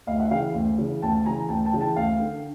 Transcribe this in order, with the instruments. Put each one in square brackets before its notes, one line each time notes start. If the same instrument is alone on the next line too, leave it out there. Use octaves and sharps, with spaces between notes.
[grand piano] D2 D#5 F5
E5 F#5
C#3 E3 F5 G5
D2
C#3 E3
D2 G5 A5
C#3 E3 G#5 A#5
D2 G5 A5
G5 A5
C#3 E3
G5 A5
D2 F5 G5
D3